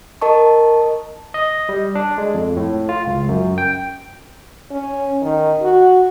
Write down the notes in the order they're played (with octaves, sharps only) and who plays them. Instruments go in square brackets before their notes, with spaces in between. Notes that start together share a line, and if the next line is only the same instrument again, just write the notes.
[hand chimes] A#4 D#5 A5 C#6
[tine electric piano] D#5
G3
D4
G#3
F2
A2
F4
C#2
F#2
G5
[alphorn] C#4
D#3
F#4